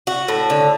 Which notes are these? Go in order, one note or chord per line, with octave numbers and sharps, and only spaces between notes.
F#4
A2
D3